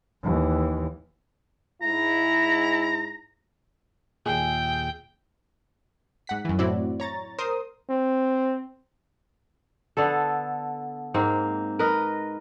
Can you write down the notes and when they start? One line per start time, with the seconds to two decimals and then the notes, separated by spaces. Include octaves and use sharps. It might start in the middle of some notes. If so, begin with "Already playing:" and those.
0.23 D#2 E3
1.82 G#2 E4 A#5
4.26 D#2 A#2 G#4 E5 G5
6.27 G#2 F#5 B6
6.45 F#2 E3
6.59 A2 C4 E4 F#4 D5
7.00 C#5 A#5 A6
7.39 A#4 C5 D#6
7.90 C4
9.97 D3 B3 A4
11.14 G#2 A#3 C4
11.79 A#4 B4 D#5